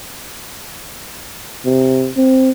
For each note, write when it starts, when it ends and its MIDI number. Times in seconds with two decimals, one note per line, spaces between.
1.66 2.11 48
2.17 2.50 60